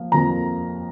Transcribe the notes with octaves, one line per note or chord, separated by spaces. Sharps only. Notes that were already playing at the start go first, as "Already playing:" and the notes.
Already playing: F3 A#3 F5
F2 F3 A#3 A#5